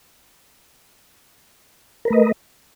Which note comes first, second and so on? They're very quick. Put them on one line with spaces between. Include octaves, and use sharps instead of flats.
A#4 B4 A3 D#5